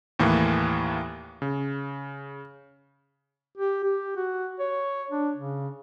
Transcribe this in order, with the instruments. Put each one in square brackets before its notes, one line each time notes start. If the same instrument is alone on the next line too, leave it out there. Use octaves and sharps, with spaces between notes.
[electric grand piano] D#2 A2 E3 A#3
C#3
[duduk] G4
G4
F#4
C#5
D4
C#3